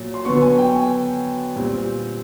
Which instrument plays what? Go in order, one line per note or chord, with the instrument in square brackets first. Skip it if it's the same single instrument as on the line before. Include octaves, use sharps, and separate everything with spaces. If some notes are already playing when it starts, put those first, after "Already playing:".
Already playing: [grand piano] A#2 F#3
C6
D3 F#3 B3 C#6
G#5
G5
G#5
A#2 G3 C4